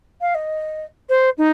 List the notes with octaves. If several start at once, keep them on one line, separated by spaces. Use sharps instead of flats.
F5
D#5
C5
D#4